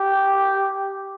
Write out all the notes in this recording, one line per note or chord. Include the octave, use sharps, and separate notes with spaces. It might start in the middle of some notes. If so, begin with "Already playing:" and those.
Already playing: G4